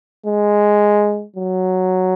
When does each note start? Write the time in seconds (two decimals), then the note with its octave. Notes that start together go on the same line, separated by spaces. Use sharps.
0.26 G#3
1.36 F#3